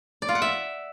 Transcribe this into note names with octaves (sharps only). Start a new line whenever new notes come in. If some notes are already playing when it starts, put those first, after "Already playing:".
D5
F4
F#5
E5